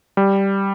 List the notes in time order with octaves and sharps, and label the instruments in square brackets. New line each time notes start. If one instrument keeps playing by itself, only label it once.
[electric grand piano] G3